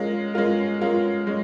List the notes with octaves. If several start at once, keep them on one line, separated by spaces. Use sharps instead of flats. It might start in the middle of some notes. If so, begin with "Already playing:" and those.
Already playing: G#3 C#4 F4 A#4
G#3 C#4 F4 A#4
G#3 C#4 F4 A#4
G#3 C#4